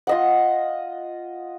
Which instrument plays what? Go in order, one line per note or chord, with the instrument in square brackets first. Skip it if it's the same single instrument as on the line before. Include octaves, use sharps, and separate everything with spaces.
[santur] F4 D#5 F#5